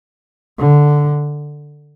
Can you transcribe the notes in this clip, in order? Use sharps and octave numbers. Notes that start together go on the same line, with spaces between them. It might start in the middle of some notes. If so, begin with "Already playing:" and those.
D3